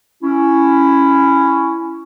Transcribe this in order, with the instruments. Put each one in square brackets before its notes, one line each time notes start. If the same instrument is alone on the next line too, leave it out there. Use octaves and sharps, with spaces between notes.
[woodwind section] C#4 E4